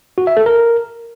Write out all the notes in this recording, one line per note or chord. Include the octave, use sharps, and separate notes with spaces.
F#4
E5
A4
A#4